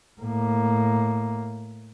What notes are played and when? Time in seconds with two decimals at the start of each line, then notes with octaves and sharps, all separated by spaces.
0.21 A2 A#3